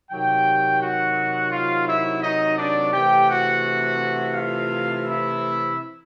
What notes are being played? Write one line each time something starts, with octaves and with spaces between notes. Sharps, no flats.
C3 D#3 F#3 G4 G5
F#4 F#5
F4 F5
E4 E5
D#4 D#5
D4 D5
C3 E3 A3 G4 G5
F#4 F#5
F4 F5
E4 E5